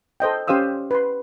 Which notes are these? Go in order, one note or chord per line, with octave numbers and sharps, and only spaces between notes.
A4 C5 D#5 G5
C#4 G4 C5 F5 D#6 E6
B4 C6